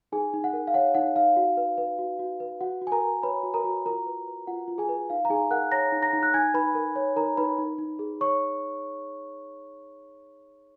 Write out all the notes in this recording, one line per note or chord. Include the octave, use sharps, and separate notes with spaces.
D#4 G#4 G#5
D#4
F#5
A#4
F5
C#5 F#5
D#4 F#5
D#4 F5
F#4
B4
B4
F#4
F#4
B4
F#4 F#5
F#4
G#5
A#4 A#5
A#4
B4 C#5 B5
F#4
A#4 A#5
F#4
F4 A#4 A#5
B4
B4
F4 F#5
F4
G#4 G#5
B4
D#4 F5
A#5
D#4 G#4 G#5
A#4 F#5 F#6
C#5 A#5 A#6
D#4
A#5 A#6
D#4
F#6
D#4 G#5 G#6
D#4 B4 B5
A#4
C#5
D#4 A#4 A#5
D#4 B4 B5
D#4
D#4
G#4
C#5 C#6